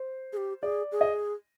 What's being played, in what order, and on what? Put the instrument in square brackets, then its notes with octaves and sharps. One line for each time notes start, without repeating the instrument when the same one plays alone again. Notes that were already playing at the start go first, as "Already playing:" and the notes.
Already playing: [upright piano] C5
[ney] G#4
G4
[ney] G#4 [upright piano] D5
[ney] G#4
[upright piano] D#5